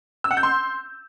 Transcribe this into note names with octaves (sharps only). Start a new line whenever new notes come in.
E6
F#5
G6
C6